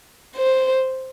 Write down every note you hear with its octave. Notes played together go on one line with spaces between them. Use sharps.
C5